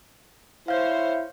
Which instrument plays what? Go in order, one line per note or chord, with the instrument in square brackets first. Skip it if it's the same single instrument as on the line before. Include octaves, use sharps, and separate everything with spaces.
[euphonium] E4 [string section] C5 C#5 [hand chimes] F5 G6